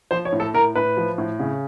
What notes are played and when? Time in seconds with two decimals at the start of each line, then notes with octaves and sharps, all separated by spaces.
0.11 F3 C5
0.25 C#5
0.32 A2
0.40 A4
0.54 A2 A#4
0.75 A2 B4
0.97 F3
1.18 A2
1.40 C#3